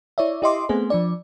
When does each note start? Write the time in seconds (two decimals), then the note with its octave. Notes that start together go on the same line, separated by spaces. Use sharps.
0.18 E4 C#5 D5 E5
0.42 E4 G4 D#5 E5 C6 D6
0.69 A3 B3 C4 G#4 C5
0.90 F3 D4 D5